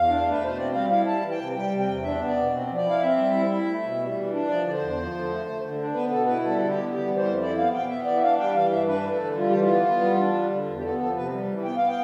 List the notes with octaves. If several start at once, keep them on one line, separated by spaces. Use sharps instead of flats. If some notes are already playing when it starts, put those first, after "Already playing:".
Already playing: E2 F5
D4
A3
B4
B2 C5
C4 D5
G3 F5
E4 F5
G3 A5
E3
G5
C3
G3 G5
C3
G5
E2
D4 E5
B3
D5
B2
C4
F3
D5
E4 F5
C4 E5
G3
E4
E4
A3
B2
G3
E3
D4
F3 D5
D3 D5
C5
E2
F3
D3
A3
A3
D3
D4
B3 B4
B2 A4
E4 B4
G3 A4
D3 A4
G4
B3
G3 G4
E3
C5
F2
E4 D5
B3 F5
B2 G5
B3 E5
E3 D5
E5
D4 F5
G3 G5
E3 F5
G2 E5
D4 B4
A3
A4
D3
G3 F4
E3 G4
F4
B3
B3
G3
D4
G3
D3
E2
G4
B3 A4
F3 A4
C3 B4
G3
E3
B3 G5
B3 F5
G5